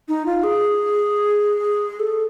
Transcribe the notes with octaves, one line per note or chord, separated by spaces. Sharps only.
D#4
F4
G#4
A4